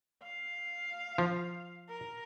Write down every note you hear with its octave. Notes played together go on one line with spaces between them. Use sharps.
F5
F3
A#4